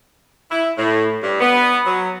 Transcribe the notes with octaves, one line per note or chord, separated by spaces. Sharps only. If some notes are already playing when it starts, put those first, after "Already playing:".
E4
A2
G2
B3
F#3